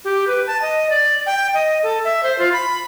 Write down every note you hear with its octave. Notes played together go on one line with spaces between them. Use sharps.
G4
B4
A5
D#5
D5
G5
D#5
A4
E5
C5
F4
B5